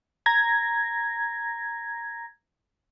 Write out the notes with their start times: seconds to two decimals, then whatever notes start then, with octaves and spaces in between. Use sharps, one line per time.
0.26 A#5 G#6 A#6